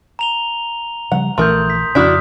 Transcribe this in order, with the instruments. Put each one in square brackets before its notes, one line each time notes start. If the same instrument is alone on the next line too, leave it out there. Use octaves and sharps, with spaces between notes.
[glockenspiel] A#5 F7 G7
[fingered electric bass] C#3 F3 G3 [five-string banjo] F#5
[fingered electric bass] A#1 E3 [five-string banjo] A3 A#4 [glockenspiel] C6 D#6 G6
[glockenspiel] B6
[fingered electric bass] F2 C#3 [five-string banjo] D4 E4 F#4 [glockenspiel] D#6 F6 B6